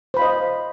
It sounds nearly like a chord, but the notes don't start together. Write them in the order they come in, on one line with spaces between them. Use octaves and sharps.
C5 B5 F5 D#5